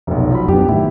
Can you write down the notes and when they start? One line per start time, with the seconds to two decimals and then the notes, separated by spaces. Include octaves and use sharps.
0.07 F1 B1
0.31 F3 F#3 B5
0.48 F#2 B3 D4 G4
0.68 A2 D#3 E4